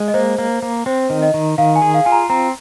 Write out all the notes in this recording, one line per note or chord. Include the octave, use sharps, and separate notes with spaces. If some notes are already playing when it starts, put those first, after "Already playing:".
Already playing: G#3
D#5
A#3 C5
A#3
A#3
C4 C5
D#3
D#5
D#3
D#3 F5
G#5
G#4
F5
F4 G#5
A#5
C4 A#5